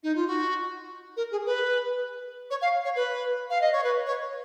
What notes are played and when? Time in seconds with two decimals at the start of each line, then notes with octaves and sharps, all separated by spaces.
0.03 D#4
0.15 F4
0.27 F#4
1.16 A#4
1.31 G#4
1.46 B4
2.50 C#5
2.61 F5
2.84 C#5
2.95 B4
3.50 F5
3.61 D#5
3.72 C#5
3.83 B4
4.06 C#5